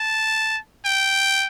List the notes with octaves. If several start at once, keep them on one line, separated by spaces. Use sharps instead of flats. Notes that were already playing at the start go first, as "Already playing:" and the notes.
Already playing: A5
G5